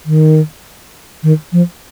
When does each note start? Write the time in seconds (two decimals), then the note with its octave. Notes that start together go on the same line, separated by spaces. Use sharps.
0.06 D#3
1.23 D#3
1.52 F3